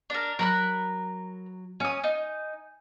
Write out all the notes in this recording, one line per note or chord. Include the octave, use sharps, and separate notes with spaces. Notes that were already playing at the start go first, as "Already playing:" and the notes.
D4 A#4
F#3 A#4 B5 F#6
C#4 G#5 D#6
D#4